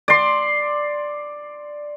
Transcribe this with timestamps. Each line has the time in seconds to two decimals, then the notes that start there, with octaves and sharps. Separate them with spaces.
0.08 D5 C6